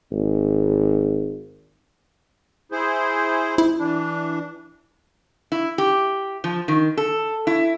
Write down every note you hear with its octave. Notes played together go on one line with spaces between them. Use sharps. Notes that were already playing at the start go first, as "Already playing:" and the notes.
G#1
E4 G#4 C5
E4
E3 D4
E4
G4
F3
D#3
A4
E4